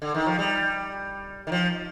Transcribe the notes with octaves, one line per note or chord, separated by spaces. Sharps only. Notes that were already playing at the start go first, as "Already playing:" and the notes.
D3
D#3
F3
G3
D#3
F3